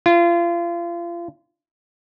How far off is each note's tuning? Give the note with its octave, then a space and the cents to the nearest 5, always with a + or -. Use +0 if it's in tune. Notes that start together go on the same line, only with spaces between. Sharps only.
F4 -30